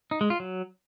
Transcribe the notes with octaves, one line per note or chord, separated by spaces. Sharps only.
D#4
G#3
F4
F#3